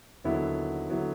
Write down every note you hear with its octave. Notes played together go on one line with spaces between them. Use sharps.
D#2 D3 F#3 B3 E4
D3 F#3 B3 E4